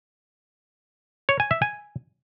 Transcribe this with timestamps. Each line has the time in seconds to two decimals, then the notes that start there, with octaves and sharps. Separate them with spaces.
1.29 C#5
1.40 G#5
1.51 E5
1.62 G#5